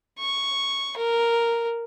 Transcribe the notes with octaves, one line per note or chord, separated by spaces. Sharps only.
C#6
A#4